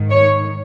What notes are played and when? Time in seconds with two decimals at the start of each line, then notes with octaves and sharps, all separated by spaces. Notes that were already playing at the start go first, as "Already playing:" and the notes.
Already playing: G#2 D#3
0.10 C#5